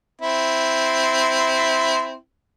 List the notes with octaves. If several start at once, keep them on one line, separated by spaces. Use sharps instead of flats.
C4 E4